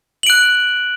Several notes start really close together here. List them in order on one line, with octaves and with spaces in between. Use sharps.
F#7 D7 F#6